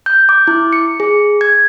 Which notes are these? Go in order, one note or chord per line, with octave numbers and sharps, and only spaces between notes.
G6
D6
E4
C#7
G#4
G#6